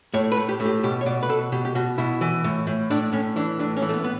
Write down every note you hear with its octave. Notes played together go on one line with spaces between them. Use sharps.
A2 C#5
B4
A2
G4
A2
G4
B2 G4
C#5
B2 D5
B4
B2 A4
B2 G4
G4
B2 F#4
B2 E4
E3
A2
A2
A2 D4
A2 C#4
E3 D4
A2 D4
C#4
E3
A3
B3
B3